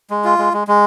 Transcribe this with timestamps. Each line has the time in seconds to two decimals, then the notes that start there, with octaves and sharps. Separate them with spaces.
0.10 G#3
0.24 F4
0.39 G#3
0.53 G#3
0.68 G#3